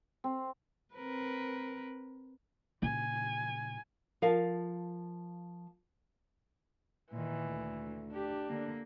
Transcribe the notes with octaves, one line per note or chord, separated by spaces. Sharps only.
C4
C4 A#4 B4
A#2 C#3 G#5
F3 A#4 F5 A5
A#2 D#3 E3
D2
D4 G4
D3 A#3